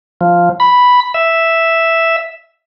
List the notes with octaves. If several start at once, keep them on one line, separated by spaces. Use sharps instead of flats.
F3
B5
E5